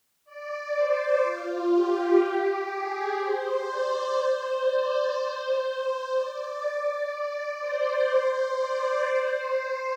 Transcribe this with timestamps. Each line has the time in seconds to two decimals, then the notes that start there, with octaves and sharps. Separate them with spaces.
0.25 D5
0.74 C5
1.23 F4
1.72 G4
2.70 G#4
3.19 C5
3.68 D5
4.16 C5
4.65 D5
5.15 C5
5.64 C5
6.13 D5
7.59 C5
8.08 C5
8.57 D5
9.07 C5